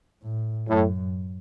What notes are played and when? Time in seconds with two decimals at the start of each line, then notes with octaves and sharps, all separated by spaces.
0.22 A2
0.68 F#2 A2